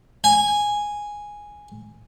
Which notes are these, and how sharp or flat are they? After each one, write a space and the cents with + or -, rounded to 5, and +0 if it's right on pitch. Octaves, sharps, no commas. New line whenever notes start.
G#5 -5